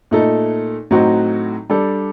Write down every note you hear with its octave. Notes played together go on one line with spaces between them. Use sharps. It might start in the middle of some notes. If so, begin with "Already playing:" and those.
A#2 A3 D#4 A4
A2 F#3 C4 D#4 F#4
G3 D4 A4